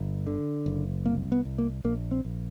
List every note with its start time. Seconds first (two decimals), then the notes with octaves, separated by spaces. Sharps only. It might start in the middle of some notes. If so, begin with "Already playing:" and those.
Already playing: G1
0.27 D3
0.66 F#1
1.06 C2 A#3
1.32 B3
1.45 C2
1.58 A#3
1.84 A#1 A#3
2.11 C4
2.25 A#1